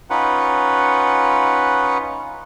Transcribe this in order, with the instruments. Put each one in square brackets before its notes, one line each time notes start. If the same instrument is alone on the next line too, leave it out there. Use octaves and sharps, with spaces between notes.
[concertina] C#4 D#4 F4 B4 F#5